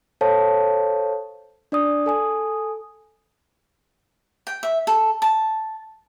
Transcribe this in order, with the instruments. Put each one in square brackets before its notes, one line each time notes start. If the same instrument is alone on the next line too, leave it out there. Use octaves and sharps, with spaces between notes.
[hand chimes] A4 C5 C#5 F5 A5
D4 D5 D#6
A4 G#5 D#6
[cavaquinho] G5
E5
A4
A5